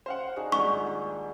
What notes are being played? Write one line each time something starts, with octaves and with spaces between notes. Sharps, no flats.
C5 F5 F#5
D4 D#4 F#4 G#4
D#1 G#2 C#6